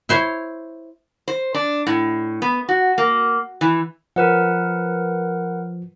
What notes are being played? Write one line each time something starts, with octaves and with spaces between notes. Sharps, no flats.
E4 C5 C#5
C5
D4
A2
B3
F#4
A#3
E3
F3 A#4 B4 F#5